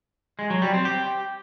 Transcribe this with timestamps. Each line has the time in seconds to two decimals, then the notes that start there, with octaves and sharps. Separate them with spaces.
0.39 G#3
0.50 F#3
0.62 G3
0.74 C4
0.85 G4